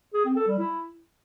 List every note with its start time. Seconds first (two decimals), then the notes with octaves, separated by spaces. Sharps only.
0.14 G#4
0.25 C4
0.36 A4
0.47 G3
0.58 E4